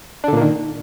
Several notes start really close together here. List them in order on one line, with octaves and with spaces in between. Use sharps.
D4 D3 A#2 A#3 D#3